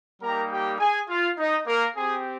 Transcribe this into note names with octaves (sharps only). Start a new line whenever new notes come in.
G3 A#3 D#4 G4 A#4 A#5
G4 G5
G#4 G#5
F4 F5
D#4 D#5
A#3 A#4
C4 G4 G#4